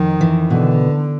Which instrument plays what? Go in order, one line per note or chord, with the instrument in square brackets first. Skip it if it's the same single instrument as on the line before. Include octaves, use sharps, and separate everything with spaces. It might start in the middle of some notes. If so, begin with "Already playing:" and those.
Already playing: [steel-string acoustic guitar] F2 [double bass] D#3
[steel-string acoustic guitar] E3
[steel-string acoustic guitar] B2 [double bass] D3